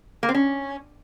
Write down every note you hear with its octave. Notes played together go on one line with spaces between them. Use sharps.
A#3
C4
C#4